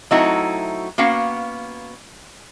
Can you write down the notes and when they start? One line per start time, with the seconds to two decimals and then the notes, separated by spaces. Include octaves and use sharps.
0.11 F#3 A3 C4 D#4 E4 F#4
0.98 A#3 B3 C#4 F#4 F5